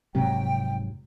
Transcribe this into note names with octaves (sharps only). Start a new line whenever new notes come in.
F1 G#2 C3 F#3 G5